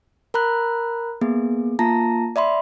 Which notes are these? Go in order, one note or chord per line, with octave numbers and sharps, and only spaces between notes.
A#4 A#5 B5 F#6
A#3 B3 G#4
A#3 F4 A5 A#5 A#6
D5 E5 B5 C6